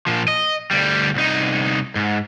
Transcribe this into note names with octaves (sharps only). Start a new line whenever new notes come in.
A#2 F3
D#5
D2 G3
C2 D#4
G#2